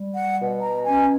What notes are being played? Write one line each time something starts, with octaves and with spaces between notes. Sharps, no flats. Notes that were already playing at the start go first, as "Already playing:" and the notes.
Already playing: G3
F#5
B2
A#5
C#4 G#5